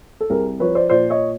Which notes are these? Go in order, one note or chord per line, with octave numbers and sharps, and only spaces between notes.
A4
C2 G#4 A#4
F3 B4 C#5
C5 D5
A#2 C5 D5
C#5 D#5